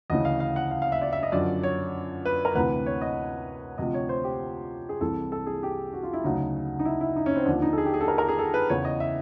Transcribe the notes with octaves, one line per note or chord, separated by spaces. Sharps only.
D2 C#3 E3 D#5
F5
F5
F#5
F5
F5
E5
D5
E5
D#5
F#2 D3 F3 D5
C#5
B4
A#4
D2 C3 E3 B4
C#5
D#5
D2 C3 F3 D#5
C#5
C5
G4
G#4
C2 C3 E3 A4
A4
G#4
G4
F#4
F4
E4
D2 C#3 F#3 D#4
D#4
E4
E4
D#4
C#4
C4
D#2 D3 F3 D4
D#4
A4
G#4
G4
G#4
A4
A#4
A#4
G#4
A4
B4
E2 C#3 E3 C#5
D#5
E5